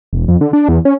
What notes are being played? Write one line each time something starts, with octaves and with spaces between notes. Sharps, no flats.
E1
F2
D3
D4
E2
C#4